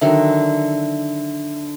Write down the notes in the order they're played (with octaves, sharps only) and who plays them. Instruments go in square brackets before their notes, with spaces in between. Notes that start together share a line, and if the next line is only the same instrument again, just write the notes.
[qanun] D3 D#3 F#3 [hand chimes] E5